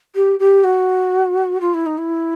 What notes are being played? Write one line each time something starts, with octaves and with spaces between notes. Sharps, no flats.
G4
G4
F#4
F4
E4
D#4
E4